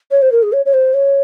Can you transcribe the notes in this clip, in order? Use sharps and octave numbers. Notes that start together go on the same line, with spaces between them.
C#5
C5
A#4
G#4
C#5
C#5
C5
C#5